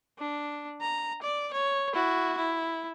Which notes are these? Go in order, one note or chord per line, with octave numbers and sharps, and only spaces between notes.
D4
A#5
D5
C#5
E4 F#4
E4